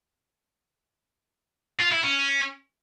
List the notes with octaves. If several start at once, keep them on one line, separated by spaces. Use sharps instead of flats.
F4
E4
C#4